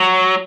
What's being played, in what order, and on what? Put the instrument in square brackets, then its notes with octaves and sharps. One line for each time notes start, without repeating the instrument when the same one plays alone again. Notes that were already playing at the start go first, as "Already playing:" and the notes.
Already playing: [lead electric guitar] F#3